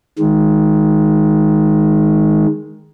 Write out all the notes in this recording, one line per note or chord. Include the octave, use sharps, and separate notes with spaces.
D#3 G#3